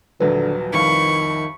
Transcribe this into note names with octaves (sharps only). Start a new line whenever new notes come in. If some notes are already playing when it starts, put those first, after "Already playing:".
D#1 A#1 D3 F#3 B4
C2 F2 D#3 F5 B5 C#6